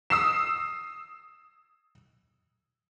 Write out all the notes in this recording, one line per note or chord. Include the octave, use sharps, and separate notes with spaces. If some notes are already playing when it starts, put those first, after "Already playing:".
D#6 E6 C7 E7